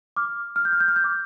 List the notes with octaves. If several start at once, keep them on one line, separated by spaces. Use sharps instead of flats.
D6 F6
F6
G6
F6
G6
F6
G6
D6 F6